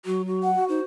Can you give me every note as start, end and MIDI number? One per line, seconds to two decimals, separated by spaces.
0.05 0.54 54
0.05 0.22 66
0.27 0.55 66
0.43 0.65 78
0.55 0.83 66
0.69 0.80 63
0.69 0.84 72